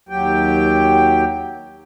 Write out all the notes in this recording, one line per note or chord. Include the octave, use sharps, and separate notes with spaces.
D#2 F#3 G4 G5